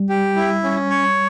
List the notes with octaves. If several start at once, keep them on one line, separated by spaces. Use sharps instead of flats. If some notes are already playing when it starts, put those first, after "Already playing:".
Already playing: G3
G4
E4
C#4
C#5